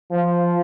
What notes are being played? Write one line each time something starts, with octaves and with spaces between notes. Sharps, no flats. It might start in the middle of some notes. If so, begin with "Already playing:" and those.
F3